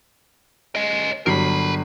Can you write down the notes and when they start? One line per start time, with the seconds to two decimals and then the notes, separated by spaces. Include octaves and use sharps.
0.75 C#4 D#5
1.26 G1 F#3 A#4 B5 C7